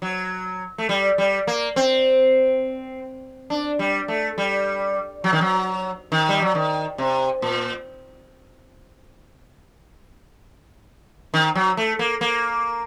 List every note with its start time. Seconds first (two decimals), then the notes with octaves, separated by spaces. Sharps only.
0.02 F#3
0.78 A3
0.89 G3
1.18 G3
1.47 A#3
1.76 C4
3.50 D4
3.79 G3
4.08 A3
4.38 G3
5.24 F#3
5.33 D#3
5.41 F#3
6.12 D#3
6.29 G3
6.42 F#3
6.55 D#3
6.98 C3
7.42 A#2
11.34 D#3
11.55 F#3
11.77 A3
11.99 A#3
12.21 A#3